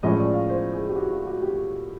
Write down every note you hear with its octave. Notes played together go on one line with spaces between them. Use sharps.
A2 F3 G#3 C#4 D#5
D5
F5
C5
G#4
G4
F#4
F4
F#4
G4